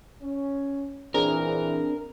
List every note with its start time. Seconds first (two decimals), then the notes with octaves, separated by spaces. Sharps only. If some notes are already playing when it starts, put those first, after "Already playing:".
0.22 C#4
1.14 A#2 E3 C4 D4 G#4 A#4